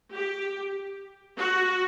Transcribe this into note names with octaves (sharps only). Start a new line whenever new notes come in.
G4
F#4